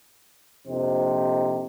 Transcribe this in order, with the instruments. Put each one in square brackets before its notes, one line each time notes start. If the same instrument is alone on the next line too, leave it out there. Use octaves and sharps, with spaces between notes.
[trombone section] A#1 F2 C3 D#4 G4 C5